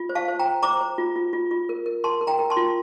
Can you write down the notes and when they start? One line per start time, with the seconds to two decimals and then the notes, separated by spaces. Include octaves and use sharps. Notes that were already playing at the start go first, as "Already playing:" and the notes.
Already playing: F4
0.09 C5
0.15 F5 A5
0.28 C5
0.39 G5 A#5
0.45 C5
0.63 C5 A#5 D6
0.81 C5
0.98 F4
1.16 F4
1.33 F4
1.51 F4
1.69 A#4
1.86 A#4
2.04 A#4 A5 C6
2.21 A#4
2.27 G5 A#5
2.39 A#4
2.50 A5 C6
2.57 F4